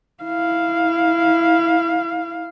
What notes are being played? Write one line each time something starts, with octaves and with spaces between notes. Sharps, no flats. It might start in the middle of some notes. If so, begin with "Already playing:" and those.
E4 F5